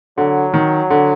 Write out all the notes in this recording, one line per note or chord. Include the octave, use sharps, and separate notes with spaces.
D3 F#3
D#3
D3